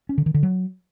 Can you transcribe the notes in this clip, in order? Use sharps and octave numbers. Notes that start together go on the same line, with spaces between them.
C#4
D3
D#3
D3
F#3